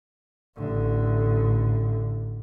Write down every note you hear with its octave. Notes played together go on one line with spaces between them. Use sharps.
A1 D3